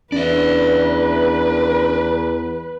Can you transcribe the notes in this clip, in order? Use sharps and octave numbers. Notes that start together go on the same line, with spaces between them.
E2 C#4 D4 B4 D5 E5